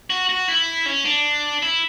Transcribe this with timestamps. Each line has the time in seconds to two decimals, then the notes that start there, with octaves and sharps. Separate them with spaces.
0.10 F#4
0.29 F#4
0.48 E4
0.86 C#4
1.05 D4
1.62 E4